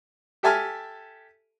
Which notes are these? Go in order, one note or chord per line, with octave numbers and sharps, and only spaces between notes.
G4 A4 E5 G#5 A5 F6